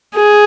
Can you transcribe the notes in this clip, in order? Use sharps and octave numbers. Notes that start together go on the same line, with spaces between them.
G#4